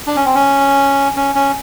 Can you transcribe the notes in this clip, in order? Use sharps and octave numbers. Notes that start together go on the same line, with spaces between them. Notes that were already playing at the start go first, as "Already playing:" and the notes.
D4
C#4
C4
C#4
C#4
C#4